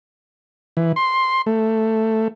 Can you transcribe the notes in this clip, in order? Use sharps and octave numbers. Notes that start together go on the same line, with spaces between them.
E3
C6
A3